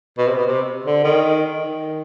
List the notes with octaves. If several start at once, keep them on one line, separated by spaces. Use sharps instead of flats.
B2
C3
B2
C3
D3
D#3
D#3